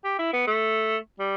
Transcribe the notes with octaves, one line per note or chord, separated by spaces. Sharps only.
G4
E4
B3
A3
G3